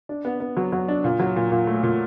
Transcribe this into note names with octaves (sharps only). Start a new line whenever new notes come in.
D4
B3
B3
F#3
F#3
D4
A#2
F#3
A#2
A#2
A3
A#2